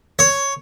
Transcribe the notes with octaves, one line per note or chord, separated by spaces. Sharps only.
C#5